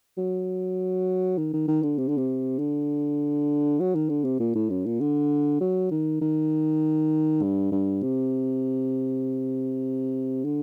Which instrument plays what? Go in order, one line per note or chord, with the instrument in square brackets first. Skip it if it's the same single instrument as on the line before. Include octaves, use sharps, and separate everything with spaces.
[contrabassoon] F#3
D#3
D#3
D#3
D3
C3
D3
C3
D3
F#3
D#3
D3
C3
A#2
A2
F#2
A#2
D3
F#3
D#3
D#3
G2
G2
C3
D3